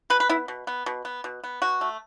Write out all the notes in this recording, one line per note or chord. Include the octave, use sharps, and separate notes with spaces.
B2 B4
B4
B3 E4
B2
B3
B2
B3
B2
B3
B2 F#4
A3